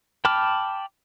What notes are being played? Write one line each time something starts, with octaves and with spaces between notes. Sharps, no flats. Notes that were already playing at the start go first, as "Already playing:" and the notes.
G5 A5 B5 D6 F6